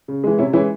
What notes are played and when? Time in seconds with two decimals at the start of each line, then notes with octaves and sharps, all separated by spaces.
0.08 C#3
0.24 E3 G#3
0.39 C3 C#4 E4
0.53 E3 G#3 C#4 E4